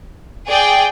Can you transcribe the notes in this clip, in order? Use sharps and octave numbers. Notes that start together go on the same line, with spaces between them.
G#4 D5 G5